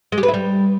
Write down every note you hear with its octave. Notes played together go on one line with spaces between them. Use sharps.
G#3
G4
B4
E4
G3